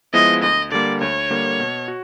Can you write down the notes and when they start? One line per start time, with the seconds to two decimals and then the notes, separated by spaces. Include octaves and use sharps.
0.14 F3 G#3 B3 E4 D#5
0.42 D2 D#5
0.72 D3 G3 A#3 D5
1.01 D2 C#5
1.30 D3 G3 A#3
1.60 B2
1.88 F#4